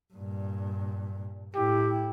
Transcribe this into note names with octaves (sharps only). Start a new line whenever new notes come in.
G2 A#2
A2 E4 G4